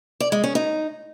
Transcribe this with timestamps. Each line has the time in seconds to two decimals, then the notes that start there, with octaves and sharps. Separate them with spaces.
0.20 D5
0.32 G#3
0.44 C#4
0.55 D#4